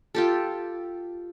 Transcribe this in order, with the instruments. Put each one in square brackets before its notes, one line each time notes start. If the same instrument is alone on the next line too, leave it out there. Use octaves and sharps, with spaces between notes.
[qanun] F4 G4 A4